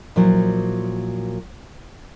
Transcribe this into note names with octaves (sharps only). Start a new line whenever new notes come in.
A#2 F3 F#3 E4